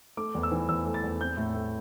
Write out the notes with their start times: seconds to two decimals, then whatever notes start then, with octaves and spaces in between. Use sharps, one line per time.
0.17 A3 D6
0.35 E2
0.43 E6
0.51 E3
0.69 E2 E6
0.86 A3
0.94 A6
1.03 E2
1.20 C4 G6
1.37 A2
1.55 A3